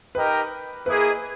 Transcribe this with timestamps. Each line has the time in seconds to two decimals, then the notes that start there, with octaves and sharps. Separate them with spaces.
0.15 D#4 G4 A#4 B4 D#5 G5
0.85 A#3 E4 G#4 B4 D#5